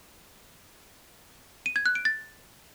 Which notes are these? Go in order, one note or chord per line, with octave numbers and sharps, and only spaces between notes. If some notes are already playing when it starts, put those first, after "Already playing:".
D#7
G#6
F#6
D7
A6